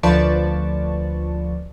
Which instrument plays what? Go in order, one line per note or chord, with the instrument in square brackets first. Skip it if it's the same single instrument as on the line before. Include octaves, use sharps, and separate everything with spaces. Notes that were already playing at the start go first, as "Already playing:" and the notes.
[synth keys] D2 F3 B4 D5 A5 C#6